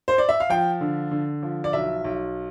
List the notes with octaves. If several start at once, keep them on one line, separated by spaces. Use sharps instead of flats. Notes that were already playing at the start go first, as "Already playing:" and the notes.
C5
D5
E5
F5
F3 G5
D3
D3
F3
D5
B1 E5
B1